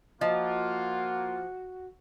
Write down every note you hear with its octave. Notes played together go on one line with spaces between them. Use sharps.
F3 A#3 F4 F#4 D#5